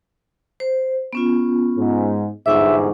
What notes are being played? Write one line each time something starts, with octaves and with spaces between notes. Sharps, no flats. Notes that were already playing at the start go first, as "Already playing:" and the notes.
C5
B3 C#4 F4
G#2
G1 E2 G#2 E5 F#5 C#6 D6